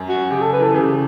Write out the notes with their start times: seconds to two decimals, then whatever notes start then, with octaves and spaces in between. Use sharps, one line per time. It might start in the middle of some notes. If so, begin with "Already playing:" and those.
Already playing: F#2
0.09 F#4
0.16 F#2
0.30 C#3 G4
0.41 A4
0.52 B4
0.59 E3 A4
0.74 C#3 G4